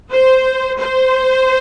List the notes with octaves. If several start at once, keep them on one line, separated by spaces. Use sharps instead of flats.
C5
C5